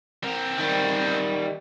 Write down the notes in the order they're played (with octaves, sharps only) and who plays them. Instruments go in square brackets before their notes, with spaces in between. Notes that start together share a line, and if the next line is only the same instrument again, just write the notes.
[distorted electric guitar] C4 A#4
[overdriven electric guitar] D#3 G3